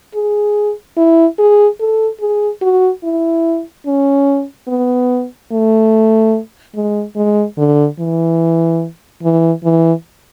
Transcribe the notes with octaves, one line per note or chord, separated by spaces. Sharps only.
G#4
E4
G#4
A4
G#4
F#4
E4
C#4
B3
A3
G#3
G#3
D3
E3
E3
E3